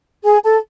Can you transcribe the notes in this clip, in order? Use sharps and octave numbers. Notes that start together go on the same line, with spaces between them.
G#4 G#5
A4 A5